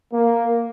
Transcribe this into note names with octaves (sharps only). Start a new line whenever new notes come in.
A#3